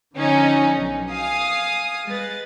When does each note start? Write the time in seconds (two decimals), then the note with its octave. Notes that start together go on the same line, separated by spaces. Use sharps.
0.16 D3 F3 C#4 D#4
0.76 B1
1.12 F5 G#5 D#6
2.09 G#3 B4 A6